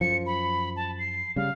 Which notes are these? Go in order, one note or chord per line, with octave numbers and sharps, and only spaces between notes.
F#2 F3 C#7
B5
A5
C7
C#3 G3 F5